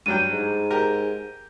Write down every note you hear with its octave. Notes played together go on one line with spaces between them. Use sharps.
G2 F#3 G5 D#7
G#2
G4 A#4